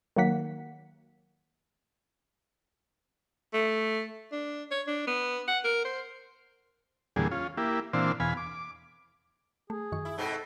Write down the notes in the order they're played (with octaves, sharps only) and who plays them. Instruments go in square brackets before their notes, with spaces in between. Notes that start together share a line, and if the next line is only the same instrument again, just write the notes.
[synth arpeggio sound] D#3 F#3 A#3 F#5 B6
[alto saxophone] A3
D4
C#5
D4
B3
F#5
A#4
C5
[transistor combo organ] E2 A#2 D3 G3 G#4
C#4 F4
A#3 E4 G4
A#2 E3 C4 D4 C5 F5
E2 B2 F5 G#5 B5
D6
[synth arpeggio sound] A3 [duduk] G#4
[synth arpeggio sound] F#2 D#3 C#6
[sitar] E4
[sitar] G#2 B2 C4 [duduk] A4